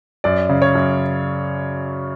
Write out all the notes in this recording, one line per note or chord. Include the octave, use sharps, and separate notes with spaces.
F#2 D5
C#3
C#5
F#2